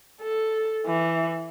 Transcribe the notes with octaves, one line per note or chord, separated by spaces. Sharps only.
A4
E3